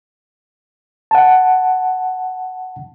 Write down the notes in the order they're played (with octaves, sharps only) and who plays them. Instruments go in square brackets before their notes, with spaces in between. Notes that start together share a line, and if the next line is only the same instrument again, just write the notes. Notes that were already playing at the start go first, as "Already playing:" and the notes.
[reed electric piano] F#5 A5